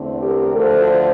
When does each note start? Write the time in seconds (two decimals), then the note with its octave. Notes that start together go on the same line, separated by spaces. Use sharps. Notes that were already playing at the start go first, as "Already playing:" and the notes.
Already playing: E2 D3 A3 C4
0.22 G4 A#4
0.55 D2 D3 F3 A3 A4 C5